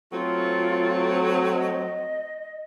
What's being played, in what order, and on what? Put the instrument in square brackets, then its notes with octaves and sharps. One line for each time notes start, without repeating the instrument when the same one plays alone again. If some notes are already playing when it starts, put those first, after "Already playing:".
[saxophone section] F#3 A3 C4 [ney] F4
[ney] D#5